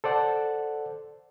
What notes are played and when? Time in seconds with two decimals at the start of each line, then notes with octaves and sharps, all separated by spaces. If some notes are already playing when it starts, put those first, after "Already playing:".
0.04 A4 C5 D5 F#5